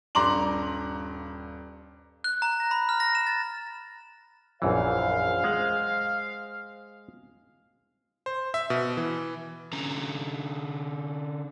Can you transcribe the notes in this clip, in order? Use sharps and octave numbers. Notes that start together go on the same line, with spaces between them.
D#1 G2 A#5 C6 D6 F#7
F#6
A#5
A#6
B5
F6
A#6
E7
A6
A#1 F#2 E3 C5 F5
G#3 G#4 F#5
C5
E5
B2
E3
D3 C#4 A#5